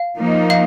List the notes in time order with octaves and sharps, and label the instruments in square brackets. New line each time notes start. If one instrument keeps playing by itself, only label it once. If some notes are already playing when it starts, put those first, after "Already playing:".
Already playing: [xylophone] F5
[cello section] F3 A#3 D#4
[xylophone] F5